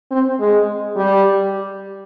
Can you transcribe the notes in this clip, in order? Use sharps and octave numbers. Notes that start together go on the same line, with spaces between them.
C4
G#3
G3